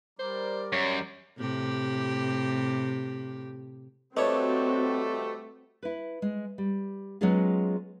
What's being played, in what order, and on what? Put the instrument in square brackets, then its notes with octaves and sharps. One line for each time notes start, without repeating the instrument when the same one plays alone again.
[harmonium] G3 A#4 D5 [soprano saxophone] C5
[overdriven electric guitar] F#2 [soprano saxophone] C#5
[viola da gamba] A2 C3 G4
[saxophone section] G3 A3 [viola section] C4 F#4 [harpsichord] D4 C#5 [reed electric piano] B4 D#5
[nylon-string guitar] E4 B4
G#3
G3
F#3 G#3 B3 C#4 F4 G#4